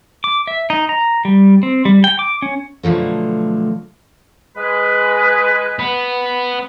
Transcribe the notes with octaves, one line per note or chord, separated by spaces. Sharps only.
D6
E5
D#4
A#5
G3
C4
G3
G5
D6
C#4
B2 D3 F3 F#3 A3
G#3 B4
B3